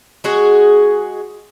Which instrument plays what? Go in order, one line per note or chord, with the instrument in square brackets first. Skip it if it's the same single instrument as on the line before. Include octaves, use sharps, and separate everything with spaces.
[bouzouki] G#3 F#4 G#4